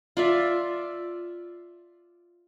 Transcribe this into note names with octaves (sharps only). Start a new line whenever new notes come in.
F4 D5 E5